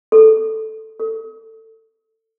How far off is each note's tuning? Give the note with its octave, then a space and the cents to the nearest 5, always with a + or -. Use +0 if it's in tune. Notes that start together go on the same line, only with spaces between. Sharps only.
A4 +0
A4 +20